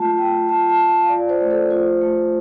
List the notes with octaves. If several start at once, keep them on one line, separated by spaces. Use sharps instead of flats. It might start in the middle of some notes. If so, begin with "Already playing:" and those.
Already playing: A3 F4 A5
F4 G5
F4 A5
A5
F4
F5
F4 D5
C5
A3
A4
F4 C5
A3